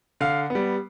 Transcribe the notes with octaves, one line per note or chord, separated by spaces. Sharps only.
D3 F5
G3 B3